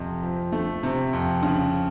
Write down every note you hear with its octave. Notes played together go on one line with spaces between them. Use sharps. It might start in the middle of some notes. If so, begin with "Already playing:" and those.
Already playing: F2 C3
F3
A3
C3
F2
C#3